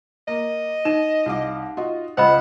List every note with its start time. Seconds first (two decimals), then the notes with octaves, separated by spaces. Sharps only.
0.28 A#3 D#5
0.85 D#4 E7
1.26 C2 F5 D6
1.77 F4 F#4 D#5
2.17 C#2 C5 D#5 F5 F#5 B5